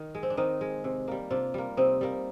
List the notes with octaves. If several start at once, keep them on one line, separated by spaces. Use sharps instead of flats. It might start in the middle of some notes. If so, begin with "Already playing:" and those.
Already playing: D#3
G#3
C4
D4
D#3 C4 D#4
G#3
C3
G3 A#3
C3 D4 F4
G3 A#3
C3 C4 D#4
G3 A#3